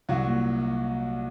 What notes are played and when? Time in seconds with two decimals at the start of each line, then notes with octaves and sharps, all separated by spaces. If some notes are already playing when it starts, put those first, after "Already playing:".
0.09 C2 F#3 F#4
0.25 A#2